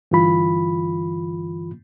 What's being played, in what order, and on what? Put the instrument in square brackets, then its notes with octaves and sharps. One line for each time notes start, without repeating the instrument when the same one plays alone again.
[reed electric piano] G2 D3 E3 F4 B5